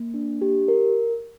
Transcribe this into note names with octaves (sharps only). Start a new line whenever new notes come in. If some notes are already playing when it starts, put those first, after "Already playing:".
Already playing: A#3
D4
G4
A#4